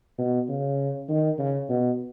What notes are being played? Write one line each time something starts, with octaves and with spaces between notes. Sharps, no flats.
B2
C#3
D#3
C#3
B2